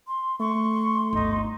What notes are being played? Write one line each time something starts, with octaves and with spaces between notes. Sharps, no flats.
C6
A3 C6 C#6
G1 D2 D#4